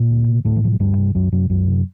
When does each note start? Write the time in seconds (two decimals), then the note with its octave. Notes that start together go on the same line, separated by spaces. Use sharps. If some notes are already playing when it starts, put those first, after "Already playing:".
Already playing: A#2 A#3
0.10 D2
0.28 C3
0.45 D2 A2 A3
0.56 E3
0.63 C3 F3
0.72 F#3
0.80 D2 G2 G3
0.97 C3
1.14 C2 F#2 F#3
1.32 F#2 C3 F#3
1.50 C2 F#2 F#3
1.67 C3